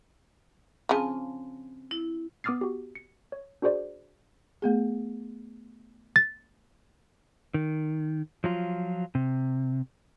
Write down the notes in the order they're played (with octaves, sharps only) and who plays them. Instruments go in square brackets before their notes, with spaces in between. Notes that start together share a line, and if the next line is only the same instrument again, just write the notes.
[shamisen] C#3 F3 [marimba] C4 G#5 A5
[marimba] E4
[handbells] B3 D6 D#6 F6 A6 C7
F#4 G4
C#7
C#5
D4 F#4 G#4 C5 D5
[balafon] A3 B3 G#4
[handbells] A6
[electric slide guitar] D#3
F3 F#3 F4
C3